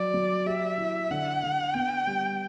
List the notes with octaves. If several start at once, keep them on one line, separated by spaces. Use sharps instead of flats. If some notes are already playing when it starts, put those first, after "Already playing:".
Already playing: F#3 D5
F#3
G4 E5
E4
D3 F#5
D3
B3 G5
G3